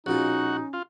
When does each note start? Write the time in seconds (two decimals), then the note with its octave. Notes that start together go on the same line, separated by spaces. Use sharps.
0.06 A#1 B2 C#4 D#4 F4 F#4
0.73 F4